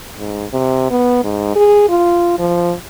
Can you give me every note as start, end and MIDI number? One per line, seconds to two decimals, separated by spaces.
0.18 0.45 44
0.53 0.86 48
0.90 1.24 59
1.24 1.52 44
1.55 1.88 68
1.89 2.34 65
2.39 2.74 53